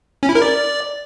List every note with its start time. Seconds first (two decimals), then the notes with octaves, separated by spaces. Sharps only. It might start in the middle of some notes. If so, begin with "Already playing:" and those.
0.23 C#4
0.29 E4
0.35 A#4
0.42 D5